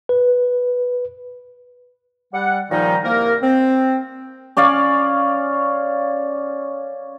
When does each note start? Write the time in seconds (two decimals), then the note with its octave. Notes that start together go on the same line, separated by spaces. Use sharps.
0.09 B4
2.34 G3 F#5
2.71 D#2 A#2 D#3 F3 G3 D#4
3.04 C2 A#3 A#4
3.43 C4
4.57 C#4 C#5 D5 F5